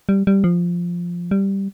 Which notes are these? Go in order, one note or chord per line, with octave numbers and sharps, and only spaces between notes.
G3
G3
F3
G3